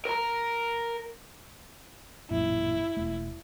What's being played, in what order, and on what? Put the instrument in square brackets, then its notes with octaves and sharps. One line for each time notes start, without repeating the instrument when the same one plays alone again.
[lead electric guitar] A#4 A#5
[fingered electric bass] A1 F#2 A#2 [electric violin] E4
[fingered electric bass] E1 A3